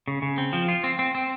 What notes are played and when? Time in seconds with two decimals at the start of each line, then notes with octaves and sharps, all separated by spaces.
0.08 C#3
0.22 C#3
0.38 C4
0.53 F3
0.68 F4
0.84 C4
0.99 C4
1.15 C4